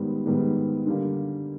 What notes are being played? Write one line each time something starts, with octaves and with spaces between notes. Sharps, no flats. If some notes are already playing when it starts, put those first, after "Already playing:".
Already playing: G#2 D#3 G3 B3
G#2 D#3 G3 B3
D3 G3 A#3